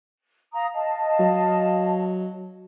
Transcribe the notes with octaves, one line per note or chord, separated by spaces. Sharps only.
F5 A#5 D#6
D#5 F5 A5
F#3